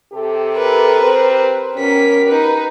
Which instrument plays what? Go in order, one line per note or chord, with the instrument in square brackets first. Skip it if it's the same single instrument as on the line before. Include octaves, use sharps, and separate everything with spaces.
[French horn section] C3 G4 A4
[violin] A#4 B4
[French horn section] C4 G4 C5
[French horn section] B2 G4 A#4 [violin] C#4 B6
[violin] D#4 B4